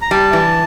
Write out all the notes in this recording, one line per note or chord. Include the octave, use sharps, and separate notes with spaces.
A#5
G3 A5
E3